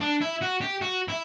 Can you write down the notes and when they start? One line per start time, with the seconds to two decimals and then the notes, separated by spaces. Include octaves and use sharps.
0.01 D4
0.21 E4
0.41 F#4
0.61 G4
0.81 F#4
1.08 E4